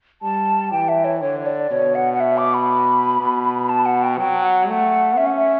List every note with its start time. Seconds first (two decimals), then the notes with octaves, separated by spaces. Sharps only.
0.22 G3 A5
0.71 E3 G5
0.89 E5
1.04 C#5
1.21 D3 C#5
1.40 C#5
1.46 D5
1.71 B2 C#5
1.95 F#5
2.13 F#5
2.20 E5
2.38 D6
2.54 B5
3.20 B2
3.69 A5
3.86 F#5
4.03 G5
4.18 F#3 G5
4.43 F#5
4.68 A3 F#5
5.17 C#4 E5
5.26 F#5
5.36 E5